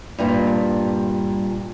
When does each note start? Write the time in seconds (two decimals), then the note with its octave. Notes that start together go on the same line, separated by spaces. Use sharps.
0.19 G2 A#2 G3